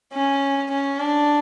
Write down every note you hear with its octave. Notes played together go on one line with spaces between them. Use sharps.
C#4
C#4
D4